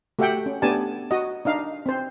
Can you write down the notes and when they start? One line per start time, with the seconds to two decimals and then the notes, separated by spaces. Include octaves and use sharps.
0.19 A3 F#4 G4 E5 F#5 G5
0.46 C#4
0.62 A3 B3 D4 G4 G#5 A5
1.11 F#4 D#5
1.45 D4 D#4 F5
1.86 C4 C5